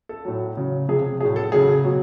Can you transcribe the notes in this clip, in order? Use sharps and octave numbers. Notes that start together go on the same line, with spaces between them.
A4
A2 F#3
C#3 F#3
C3 F3 G#4
A2 F#3 G#4
A4
C#3 F#3 G#4
B2 F#3